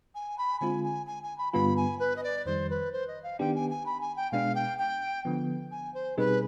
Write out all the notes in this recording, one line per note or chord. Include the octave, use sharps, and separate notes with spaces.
G#5
B5
D3 G#3 C4 F4 G#5
G#5
G#5
G#5
B5
G2 D3 G3 B3 F4 B5
G#5
B4
D#5
D5
F2 D#3 G3 C5
B4
C5
D#5
F5
D#3 B3 D4 G4 G5
G#5
G#5
B5
G#5
G5
B2 G#3 B3 D4 F5
G5
G5
D3 F3 B3
G#5
C5
B2 G3 C4 D#4 G#4 B4